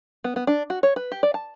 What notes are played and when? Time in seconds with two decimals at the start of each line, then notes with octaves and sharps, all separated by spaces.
0.24 B3
0.36 B3
0.47 D4
0.70 F#4
0.83 C#5
0.96 B4
1.12 G4
1.23 D5
1.34 A5